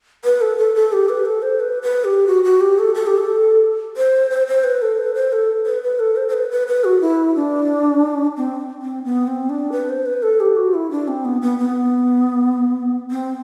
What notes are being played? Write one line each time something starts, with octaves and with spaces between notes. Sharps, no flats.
B4
A4
A4
A4
G4
B4
A4
C5
B4
B4
G4
F#4
F#4
G4
A4
A4
G4
A4
C5
C5
C5
B4
A4
B4
C5
A4
B4
B4
A4
C5
C5
B4
B4
B4
F#4
E4
D4
C4
C4
B3
C4
D4
B4
C5
B4
A4
G4
F#4
E4
D4
C4
B3
B3
B3
C4